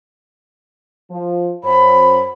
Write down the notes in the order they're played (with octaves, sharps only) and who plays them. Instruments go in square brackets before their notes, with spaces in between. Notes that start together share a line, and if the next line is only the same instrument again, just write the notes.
[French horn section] F3
[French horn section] F#2 C5 [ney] B5